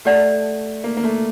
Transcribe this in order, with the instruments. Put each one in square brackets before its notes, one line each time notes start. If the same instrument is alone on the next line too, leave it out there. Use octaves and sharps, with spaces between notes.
[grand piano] A3 [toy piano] G4 D5 F#5 A5
[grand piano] A#3
A#3
A3